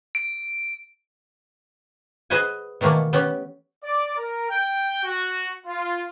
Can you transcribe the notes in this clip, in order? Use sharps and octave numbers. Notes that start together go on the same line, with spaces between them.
D7
G#4 B4 C5 D#5 F#5 G#5
B2 D#3 E3 A3 A#3
B3 C#4 G4
D5
A#4
G5
F#4
F4